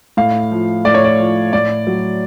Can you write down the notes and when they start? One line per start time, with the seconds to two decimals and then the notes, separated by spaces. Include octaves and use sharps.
0.17 A2 F5
0.52 F3
0.85 A2 D5
0.94 C#5
1.04 D5
1.19 F3
1.53 A2 D5
1.87 F#3